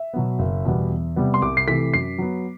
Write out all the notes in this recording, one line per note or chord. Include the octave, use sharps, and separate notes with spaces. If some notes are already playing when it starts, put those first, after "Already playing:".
Already playing: E5
B2 F#3 B3
F#1
E2 B2 G3 B3
E2
C3 G3 B3
C6
C2 D6
C7
C3 E3 A3 B6
F#2 C7
F#3 B3